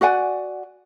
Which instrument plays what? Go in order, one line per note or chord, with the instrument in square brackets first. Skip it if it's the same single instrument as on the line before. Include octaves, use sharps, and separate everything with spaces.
[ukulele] F#4 D5 F#5 G#5